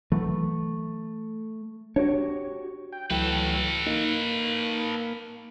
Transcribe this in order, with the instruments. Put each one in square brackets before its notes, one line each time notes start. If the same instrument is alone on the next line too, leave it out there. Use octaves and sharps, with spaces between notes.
[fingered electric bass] E3 F#3 [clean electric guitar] A3
[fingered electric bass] D4 [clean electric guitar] F#4 G4 C#5
[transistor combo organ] G5
[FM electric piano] C#2 G5 [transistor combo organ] E3 F#3 A3 [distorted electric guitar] A4 B4
[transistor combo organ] A#3 [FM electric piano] D#4